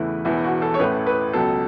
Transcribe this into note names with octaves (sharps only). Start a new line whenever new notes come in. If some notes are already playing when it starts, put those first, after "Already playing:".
Already playing: E2 C#3 E3 A3 E4 B4
E1 E2 E3 E4
F#4
A4
C#5
A1 A2 E3 A3 B4
B4
C#2 B2 F#3 A4